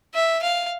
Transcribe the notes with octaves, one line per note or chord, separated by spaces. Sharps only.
E5
F5